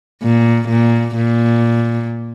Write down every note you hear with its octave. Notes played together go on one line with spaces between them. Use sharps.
A#2
A#2
A#2